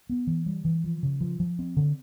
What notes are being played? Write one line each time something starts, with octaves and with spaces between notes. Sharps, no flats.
B3
E3
G3
E3
F3
C#3
F3
F3
C4
D3